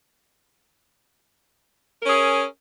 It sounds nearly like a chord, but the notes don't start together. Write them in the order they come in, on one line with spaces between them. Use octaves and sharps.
A#4 C#4 G#4